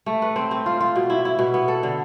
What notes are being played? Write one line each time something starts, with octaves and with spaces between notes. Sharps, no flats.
A3
B4
C4
C4
F4
F4
B2
E4
E4
B2
B3
A4
D3